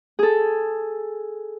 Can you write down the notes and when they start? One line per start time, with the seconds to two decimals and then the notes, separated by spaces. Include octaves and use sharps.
0.19 G#4 A4